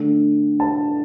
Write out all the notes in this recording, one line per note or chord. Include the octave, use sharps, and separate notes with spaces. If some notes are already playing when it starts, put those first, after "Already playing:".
Already playing: D3 A3
A5